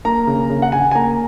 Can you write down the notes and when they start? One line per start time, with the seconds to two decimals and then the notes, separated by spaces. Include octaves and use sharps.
0.05 A#3 A#5
0.27 C#3
0.50 C#3
0.62 F#5
0.72 C#3 G#5
0.91 G#5
0.95 A#3 A#5